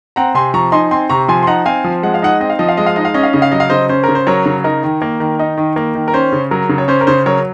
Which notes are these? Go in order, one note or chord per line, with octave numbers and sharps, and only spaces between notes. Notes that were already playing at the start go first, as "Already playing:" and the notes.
C4 F#5 A#5
C3 G#5 C6
F3 A#5 C#6
D#4 G#5 C6
C4 G#5 C6
C3 A#5 C#6
F3 G#5 C6
C6
D#4 F#5 A#5
C4 F5 G#5
F3
G#3 F#5
F5
D#4 D#5 F#5
C4 D#5
F5
F3 D#5
F5
G#3 D#5
F5
D#4 D#5
F5
C#4 D#5
F5
C#3 D#5
F5
F#3 D#5
F5
C#3 C5 D#5
C#4 C5
C#3 A#4
C5
F#3 A#4 C#5
C#3
D#4 A#4
D#3
A#3
D#3
D#4
D#3
A#3
D#3
A#4
C#4 C5
C#3
F#3 A#4
C#3
C#5
C#4 C5
A#4
C#3 C5
F#3 A#4 C#5